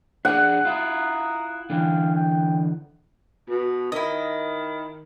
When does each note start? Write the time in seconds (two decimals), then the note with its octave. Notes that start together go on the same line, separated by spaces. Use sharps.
0.25 D4 G#4 D5 F#5
0.65 E4 F4 A#5 D#6
1.70 D3 E3 F5 G5
2.14 G5
3.49 B2
3.92 D#3 E4 D#5